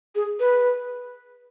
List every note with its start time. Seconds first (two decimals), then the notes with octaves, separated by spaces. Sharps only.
0.15 G#4
0.40 B4